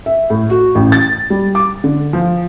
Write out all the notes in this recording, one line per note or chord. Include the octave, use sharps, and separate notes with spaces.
E5
A2
F#4
A1
A6
G3
D6
D3
F3